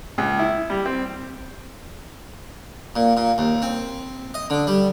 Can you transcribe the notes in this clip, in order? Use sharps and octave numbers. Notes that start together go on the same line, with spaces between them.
C#2
E4
G3
C4
A#2
A#2
D#2
C4
D#5
D3
G3